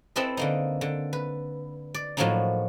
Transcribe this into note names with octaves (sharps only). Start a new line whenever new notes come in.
C4 E4 A4 B4 D#5
D3 A#3 D#4
D3
B4
D5
A2 F3 F#3 A#3 D4 D#4